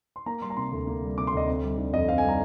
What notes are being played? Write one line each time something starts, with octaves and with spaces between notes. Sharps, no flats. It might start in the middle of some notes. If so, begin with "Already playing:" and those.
C6
A#3 A#5
G3 C6
A#5
C3 C6
D2
A#3
G3
C3 D6
C6
D2 D#5
C4
G3
D3
F2 D#5
C4 F5
G#5
G3
A#5